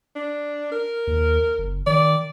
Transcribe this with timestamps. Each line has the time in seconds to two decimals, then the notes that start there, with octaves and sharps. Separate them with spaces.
0.16 D4
0.72 A#4
1.07 D#2
1.58 F#1
1.87 D#3 D5